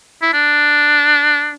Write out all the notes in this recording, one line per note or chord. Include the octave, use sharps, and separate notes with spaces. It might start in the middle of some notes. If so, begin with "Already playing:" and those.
E4
D4